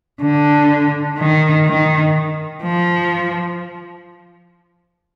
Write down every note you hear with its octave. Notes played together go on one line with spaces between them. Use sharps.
D3
D#3
D#3
F3